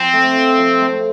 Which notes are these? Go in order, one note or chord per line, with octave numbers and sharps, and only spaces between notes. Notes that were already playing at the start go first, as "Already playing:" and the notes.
Already playing: F3 C4
A3
F3
F3
A3